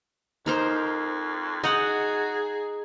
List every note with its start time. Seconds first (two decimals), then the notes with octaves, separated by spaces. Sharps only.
0.46 F2 D#4 A#4 C5
1.64 D#4 F#4 G#4 D#5 F#5